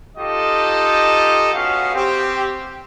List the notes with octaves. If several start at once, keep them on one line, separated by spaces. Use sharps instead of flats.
D#4 F4 G4 A4 D#5
B3 C#4 F#4 F5
C4 G4